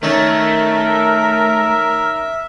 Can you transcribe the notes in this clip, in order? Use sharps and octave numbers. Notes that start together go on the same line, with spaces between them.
D#3 A3 C#4 A#4 E5